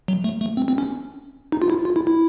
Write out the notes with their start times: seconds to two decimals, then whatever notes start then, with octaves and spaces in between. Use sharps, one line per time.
0.08 F#3
0.24 A3
0.41 A3
0.57 C4
0.68 C4
0.78 C#4
1.52 D#4
1.62 F4
1.70 E4
1.85 F4
1.96 E4
2.07 E4